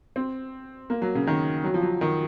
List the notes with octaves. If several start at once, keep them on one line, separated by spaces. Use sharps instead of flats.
C4
A#3
F#3
C#3
D#3
F#3
F3
F#3
D#3